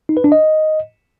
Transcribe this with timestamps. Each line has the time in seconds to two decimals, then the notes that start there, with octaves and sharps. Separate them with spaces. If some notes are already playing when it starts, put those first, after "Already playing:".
0.09 D#4
0.17 B4
0.24 D4
0.32 D#5